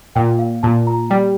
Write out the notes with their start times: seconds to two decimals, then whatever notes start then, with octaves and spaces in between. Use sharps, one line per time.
0.15 A#2 G5
0.39 F5
0.63 A#2 A5
0.87 A#5
1.10 G3 G5